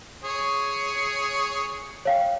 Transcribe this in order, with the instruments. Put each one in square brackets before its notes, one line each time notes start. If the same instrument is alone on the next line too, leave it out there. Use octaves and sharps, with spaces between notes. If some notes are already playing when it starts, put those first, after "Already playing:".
[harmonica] G#4 C#5
[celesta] C#5 F5 G5